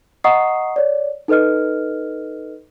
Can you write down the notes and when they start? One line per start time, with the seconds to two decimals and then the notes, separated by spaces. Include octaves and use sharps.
0.24 D#5 F#5 A#5 C#6 D#6 C7
0.76 C#5 D5
1.28 D#4 A4 B4 D#5 F6